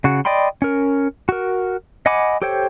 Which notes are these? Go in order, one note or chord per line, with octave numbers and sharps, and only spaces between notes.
C#3 F#4
D5 D#5 G5 B5 C6
C#4 A#4
F#4 A#4
D#5 F#5 G#5 B5 D6
G4 A4 C5 C#5 G5